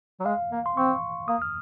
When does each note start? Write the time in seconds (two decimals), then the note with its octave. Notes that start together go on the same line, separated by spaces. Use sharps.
0.20 F#3
0.26 G#3 F5
0.52 A#3
0.66 C6
0.76 C4 C#6
1.28 A#3 D#6
1.42 F6